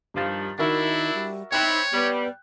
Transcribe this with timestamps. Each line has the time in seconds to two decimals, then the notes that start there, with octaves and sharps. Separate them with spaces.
0.14 G2 D#3 F3 G3 A6
0.59 D#3 D4 E4 F#4 A#4 E5
1.14 G3
1.52 C4 D#4 E4 C#5 G5 F#6
1.92 G3 B3